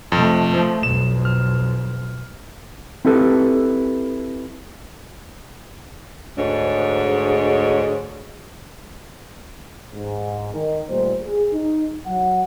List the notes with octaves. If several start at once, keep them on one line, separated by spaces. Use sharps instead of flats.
F2 C3 A3
F3 A3
B1 F2 E7
F6
C4 E4 G4 A4 B4
D2 G#2 G#3 D4 C#5
G#2
D#3
D#2 A#2 G3 A3 C5
G#4
D#4
F#3 F#5